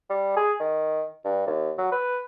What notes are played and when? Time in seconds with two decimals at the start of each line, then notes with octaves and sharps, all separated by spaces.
0.10 G3
0.37 G#4
0.60 D#3
1.25 G2
1.47 D#2
1.78 F#3
1.92 B4